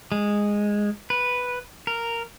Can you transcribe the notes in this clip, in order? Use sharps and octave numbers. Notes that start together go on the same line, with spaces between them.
G#3
B4
A#4